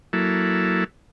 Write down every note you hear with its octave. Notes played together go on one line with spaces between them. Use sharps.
F#3 A#3 E4 A4